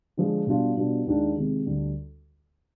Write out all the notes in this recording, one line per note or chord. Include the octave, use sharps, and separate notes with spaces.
D3 F3 G#3
B2 G3 D4 F4
B2 G3 D4 F4
D#2 D#3 G#3 D4 F4
C3 D#3 G#3
D2 D3 G3